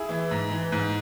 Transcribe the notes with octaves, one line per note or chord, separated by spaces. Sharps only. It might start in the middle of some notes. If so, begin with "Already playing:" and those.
Already playing: E4 G#4
E3
G#2
E3
G#2